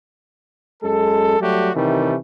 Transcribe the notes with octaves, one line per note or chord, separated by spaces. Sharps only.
F#2 G#3 A4
F#3 G3 A3 F#4 G4
C3 D#3 E3 G3 A3